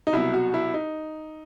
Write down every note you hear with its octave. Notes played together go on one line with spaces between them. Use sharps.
D#4
C2 B2 F#3 E4
F#4
E4
D#4